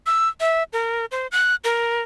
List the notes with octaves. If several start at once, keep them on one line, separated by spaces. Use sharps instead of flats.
E6
E5
A#4
C5
F#6
A#4